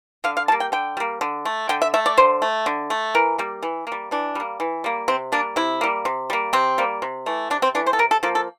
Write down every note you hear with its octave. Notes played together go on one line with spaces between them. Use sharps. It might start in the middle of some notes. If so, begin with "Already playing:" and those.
D3 F5
F5
G3 A#3 A5
G5
D3 G5
G3 A#3
D3
A3
D3 G5
E5
A3 E5
D5
D3 C5
A3
D3
A3
E3 A#4
G3 A#3
E3
G3 A#3
E3 D4
G3 A#3
E3
G3 A#3
C3 C4
G3 A#3 D4
C3 E4
G3 A#3
C3
G3 A#3
C3 C4
G3 A#3
C3
E3 A3
C3 D4
C4
E3 A3 D4
C5
A4
C3 A#4
A4
F3 A#3 A4
A4